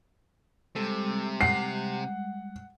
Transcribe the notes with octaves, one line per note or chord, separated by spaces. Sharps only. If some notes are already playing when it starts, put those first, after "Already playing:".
C3 G3 G#3 A4
F#5 C7